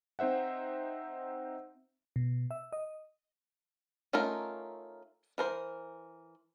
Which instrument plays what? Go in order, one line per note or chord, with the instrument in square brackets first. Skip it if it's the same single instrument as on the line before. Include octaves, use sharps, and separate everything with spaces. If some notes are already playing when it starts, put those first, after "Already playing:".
[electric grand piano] C4 D#4 C5 E5 F#5
[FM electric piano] B2
E5
D#5
[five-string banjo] A3 C#4 D#4 F4 A#4
E3 A#4 C5